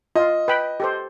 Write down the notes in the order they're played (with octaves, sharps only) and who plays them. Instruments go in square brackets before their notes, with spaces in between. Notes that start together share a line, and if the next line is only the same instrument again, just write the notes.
[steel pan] F4 [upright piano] D#5
[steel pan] B4 G5 B5
G4 A4 C5